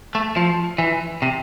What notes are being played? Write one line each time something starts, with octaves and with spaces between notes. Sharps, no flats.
A3
F3
E3
C3